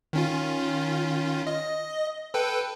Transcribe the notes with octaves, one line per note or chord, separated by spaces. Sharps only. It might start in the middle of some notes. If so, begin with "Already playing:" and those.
D#3 C#4 F4
D#5
A4 B4 G5